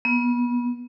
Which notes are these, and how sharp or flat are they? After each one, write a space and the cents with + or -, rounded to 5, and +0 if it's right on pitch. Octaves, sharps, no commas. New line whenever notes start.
B3 -30